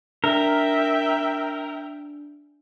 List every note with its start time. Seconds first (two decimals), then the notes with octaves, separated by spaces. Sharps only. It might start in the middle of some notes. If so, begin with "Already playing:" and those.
0.24 D4 A#4 E5 G5